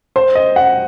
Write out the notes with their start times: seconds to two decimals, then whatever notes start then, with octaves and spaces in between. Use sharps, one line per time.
0.16 C5
0.35 D#5
0.56 F#5